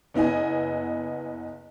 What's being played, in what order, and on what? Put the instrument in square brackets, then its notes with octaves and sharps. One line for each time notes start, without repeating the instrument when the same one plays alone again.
[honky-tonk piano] F#1 B3 E4 D#5 G#5